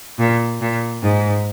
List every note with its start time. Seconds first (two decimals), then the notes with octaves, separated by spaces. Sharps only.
0.19 A#2
0.61 A#2
1.03 G#2